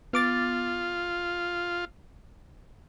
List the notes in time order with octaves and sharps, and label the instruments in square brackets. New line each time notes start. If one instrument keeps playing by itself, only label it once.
[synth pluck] B3 D6 A6 [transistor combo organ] F4